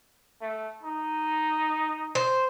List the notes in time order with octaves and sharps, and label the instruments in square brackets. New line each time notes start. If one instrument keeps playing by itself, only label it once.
[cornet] A3
D#4
[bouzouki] C5